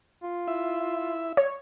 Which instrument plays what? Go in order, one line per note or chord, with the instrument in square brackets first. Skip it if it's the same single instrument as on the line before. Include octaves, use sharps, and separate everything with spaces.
[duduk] F4
[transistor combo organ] E4 E5
[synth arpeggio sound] C#5